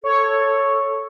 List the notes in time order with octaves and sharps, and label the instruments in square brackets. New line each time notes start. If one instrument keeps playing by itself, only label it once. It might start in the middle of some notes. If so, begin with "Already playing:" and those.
[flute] A4 [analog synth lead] C#5